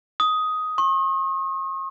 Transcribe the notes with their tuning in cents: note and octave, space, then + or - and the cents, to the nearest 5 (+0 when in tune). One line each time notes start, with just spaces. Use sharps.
D#6 +10
C#6 -45